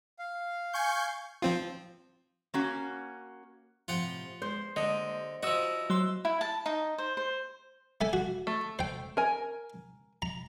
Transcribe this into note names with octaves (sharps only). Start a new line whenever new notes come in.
F5
G#5 C#6 G6
F3 C4 F4
A#3 C#4 F#4
A2 C3 F3 F4 F#5 G5
G#3 C5
D3 G3 G#3 A#3 D#5
F3 E4 F#4 D#5 E6
F#3 C6 E6
E4
A5
D#4
C5
C5
A3 A4 G#5
F#4
A3
C5 G5
A#4 G#5
A#5